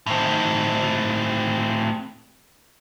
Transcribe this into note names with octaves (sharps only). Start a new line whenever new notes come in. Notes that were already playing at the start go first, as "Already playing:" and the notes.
A2 C4